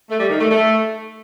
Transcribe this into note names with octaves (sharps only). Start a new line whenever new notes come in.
A3
G3
D#3
A3
A3